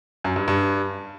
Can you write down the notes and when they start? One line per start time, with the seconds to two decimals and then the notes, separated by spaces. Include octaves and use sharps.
0.24 F#2
0.36 G2
0.48 G2